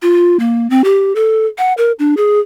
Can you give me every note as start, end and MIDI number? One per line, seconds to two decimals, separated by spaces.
0.02 0.37 65
0.39 0.69 58
0.70 0.84 60
0.84 1.15 67
1.15 1.46 69
1.58 1.73 78
1.78 1.92 70
1.99 2.15 62
2.17 2.40 68